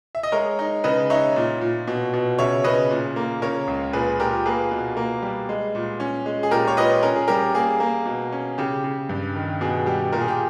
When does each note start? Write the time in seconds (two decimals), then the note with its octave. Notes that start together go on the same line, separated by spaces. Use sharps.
0.15 E5
0.23 D#5
0.32 G#3 A#4 C#5
0.59 D#4
0.84 C#3 B4 D#5
1.10 D#4 C#5 E5
1.36 A#2
1.61 A#2
1.88 B2
2.13 B2
2.39 C#3 C#5 E5
2.64 C#3 B4 D#5
2.90 A#2
3.16 A#3
3.42 C#3 A#4 C#5
3.67 C#2
3.93 A#2 G#4 B4
4.19 A#2 G4 A#4
4.45 A#3 G#4 B4
4.71 B2
4.97 A#3
5.22 G3
5.49 G#3
5.75 A#2
6.00 C#4
6.26 G#3
6.43 G#4
6.51 A#2 G4 A#4
6.68 C#5
6.77 A#2 B4 D#5
7.03 C#4 A#4
7.16 G#4
7.28 G3 G4 A#4
7.55 A#3 G#4
7.80 A#3
8.06 B2
8.32 C#4
8.58 C#3 G4
8.84 C#3
9.09 G2
9.36 D#3
9.61 B2 G#4
9.86 G3 G4
10.12 A#2 A#4
10.21 G#4
10.28 G4